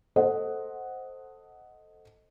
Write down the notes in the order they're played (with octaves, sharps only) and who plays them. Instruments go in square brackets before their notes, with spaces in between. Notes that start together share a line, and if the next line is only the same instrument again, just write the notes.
[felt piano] A4 C5 D#5 F#5